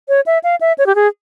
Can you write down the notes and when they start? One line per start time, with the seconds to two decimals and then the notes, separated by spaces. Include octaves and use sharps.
0.09 C#5
0.26 E5
0.44 F5
0.61 E5
0.78 C#5
0.86 G4
0.95 G#4